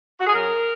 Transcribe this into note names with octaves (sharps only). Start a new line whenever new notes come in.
F#4
G#4
F#2 A#4